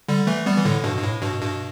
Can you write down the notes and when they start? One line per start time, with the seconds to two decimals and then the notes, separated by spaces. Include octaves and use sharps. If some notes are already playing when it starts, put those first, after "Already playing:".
0.08 D3 G3
0.27 E3 A3
0.46 G3 B3
0.57 E3
0.65 A2 D3
0.84 G2 B2
0.97 G2
1.04 A2
1.22 G2 B2
1.41 G2 B2